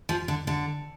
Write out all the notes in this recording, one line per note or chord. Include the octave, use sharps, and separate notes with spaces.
F3
D3
D3